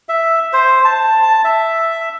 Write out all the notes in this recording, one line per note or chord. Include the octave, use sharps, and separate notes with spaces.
E5
C5
A5
A5
E5